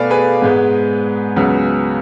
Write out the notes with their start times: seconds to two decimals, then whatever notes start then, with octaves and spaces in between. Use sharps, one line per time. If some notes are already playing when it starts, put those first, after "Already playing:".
Already playing: B2 A3 B4 D5 F5 G#5
0.10 G#4 B4
0.42 G#2 G#3 B3
1.36 C#2 C#3 F#3 B3